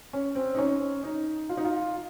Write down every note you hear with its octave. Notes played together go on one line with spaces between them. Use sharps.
C#4
C4
D#4
C#4
D#4
F4
D#4
F4